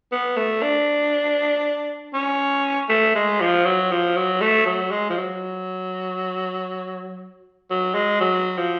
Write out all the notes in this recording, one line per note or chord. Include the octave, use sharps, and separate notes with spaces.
B3
A3
D4
C#4
A3
G#3
F3
F#3
F3
F#3
A3
F#3
G#3
F3
F#3
F#3
G#3
F#3
F3